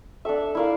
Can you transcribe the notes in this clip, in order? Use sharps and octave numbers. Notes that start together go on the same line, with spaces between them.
D4 A4 E5
E4 A#4 D5 F5